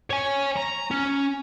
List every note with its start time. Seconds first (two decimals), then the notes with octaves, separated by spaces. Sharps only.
0.10 C#5 G#5
0.57 A#5
0.91 C#4